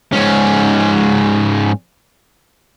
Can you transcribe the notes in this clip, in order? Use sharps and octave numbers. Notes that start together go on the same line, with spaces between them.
G#2 C#4